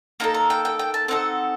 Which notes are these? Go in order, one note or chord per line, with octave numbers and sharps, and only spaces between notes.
A#3 D#4 A4 A#5
A#5
G5
G5
G5
A5
C4 D#4 A4 F#5